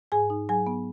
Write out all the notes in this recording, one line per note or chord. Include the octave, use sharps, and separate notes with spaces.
G#2 G#4 G#5
D#4
F#3 G#4 G#5
B3